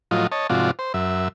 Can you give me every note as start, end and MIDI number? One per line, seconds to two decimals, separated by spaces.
0.11 0.27 45
0.11 0.27 53
0.11 0.27 54
0.11 0.27 65
0.11 0.27 75
0.32 0.47 73
0.32 0.47 75
0.32 0.47 81
0.50 0.71 44
0.50 0.71 48
0.50 0.71 53
0.50 0.71 65
0.50 0.71 66
0.50 0.71 74
0.79 0.93 72
0.94 1.28 42
0.94 1.28 76